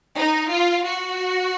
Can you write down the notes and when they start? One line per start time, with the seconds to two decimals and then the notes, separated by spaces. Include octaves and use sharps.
0.17 D#4
0.52 F4
0.87 F#4